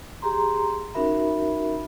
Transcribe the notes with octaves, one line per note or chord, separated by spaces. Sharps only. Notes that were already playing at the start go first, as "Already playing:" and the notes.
G4 G#4 A#5 C6
C#4 D#4 F#4 A#4 E5 B5